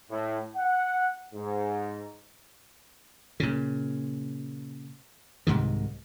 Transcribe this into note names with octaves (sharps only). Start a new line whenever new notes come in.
A2
F#5
G#2
A#2 C#3
C2 G#2 C3 D#3